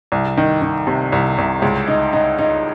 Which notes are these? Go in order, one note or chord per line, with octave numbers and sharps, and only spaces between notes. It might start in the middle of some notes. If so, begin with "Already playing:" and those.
C2
D#3
D#3
C3
C2
C2
C#2
D#4
D#4
D#4